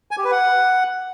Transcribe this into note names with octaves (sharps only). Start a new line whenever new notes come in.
G#5
G4
B4
F#5